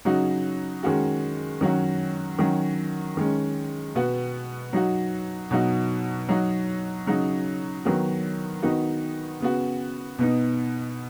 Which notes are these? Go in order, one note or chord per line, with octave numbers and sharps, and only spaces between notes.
C#3 F#3 D#4 F#4
D#3 G#3 C#4 F#4
D#3 F#3 C#4 F#4
D#3 F#3 C#4 F#4
D#3 G#3 C#4
B2 B3 F#4
F#3 D#4 F#4
B2 F#3 D#4 F#4
F#3 D#4 F#4
C#3 F#3 D#4 F#4
D#3 F#3 B3 F#4
D#3 B3 D#4 F#4
C#3 B3 F#4
B2 B3 D#4